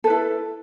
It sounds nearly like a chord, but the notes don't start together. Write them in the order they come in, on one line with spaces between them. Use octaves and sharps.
A4 B4 E4